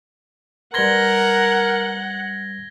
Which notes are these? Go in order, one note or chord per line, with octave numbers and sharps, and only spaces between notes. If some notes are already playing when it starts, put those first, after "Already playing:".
G3 A#4 B4 F#5 C6 G#6 A#6 G7